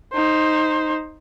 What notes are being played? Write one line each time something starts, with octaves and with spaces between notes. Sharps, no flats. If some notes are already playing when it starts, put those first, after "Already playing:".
D#4 C5